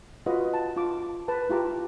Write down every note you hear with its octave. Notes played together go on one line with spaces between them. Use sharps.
F4 F#4 B4 D#5 F#5
A5
F4 D6
A5
B4 A5
E4 F4 G4 A#5 D6